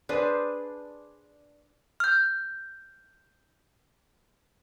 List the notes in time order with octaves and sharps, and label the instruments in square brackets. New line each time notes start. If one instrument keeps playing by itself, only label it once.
[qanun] D4 G#4 B4 C5
[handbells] F6 G6